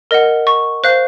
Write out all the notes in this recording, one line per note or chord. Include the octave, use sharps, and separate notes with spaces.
A#4 D#5 F#5
C#6
C5 F5 F#6